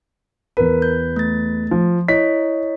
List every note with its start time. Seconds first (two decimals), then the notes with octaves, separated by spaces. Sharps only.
0.57 E2 A#4 B4
0.82 G6
1.16 A3 A6
1.71 F3
2.08 E4 C#5 D#5 B6